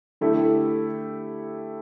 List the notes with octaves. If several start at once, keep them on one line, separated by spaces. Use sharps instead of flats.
D3 A3 E4 G4